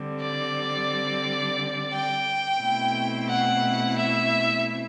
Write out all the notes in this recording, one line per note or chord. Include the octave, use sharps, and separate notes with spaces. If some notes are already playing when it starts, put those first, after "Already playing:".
Already playing: D3 G3 C4
D5
G5
B2 A3 C4 E4
F#5
E5